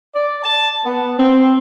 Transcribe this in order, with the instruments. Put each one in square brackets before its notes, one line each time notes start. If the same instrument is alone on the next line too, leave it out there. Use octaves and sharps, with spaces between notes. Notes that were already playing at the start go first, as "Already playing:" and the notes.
[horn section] D5
A5
B3
C4